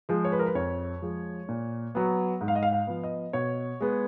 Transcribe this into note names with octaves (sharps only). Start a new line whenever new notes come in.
F3 G#3
C#5
B4
A#4
B4
F2 C#5
F3 G#3
A#2
F#3 B3
G#2
F5
D#5
F5
F5
F3 B3
D#5
B2 C#5
G#3 B3